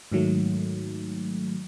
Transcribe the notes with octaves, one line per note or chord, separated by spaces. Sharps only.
G#2 D#3 F#3 A3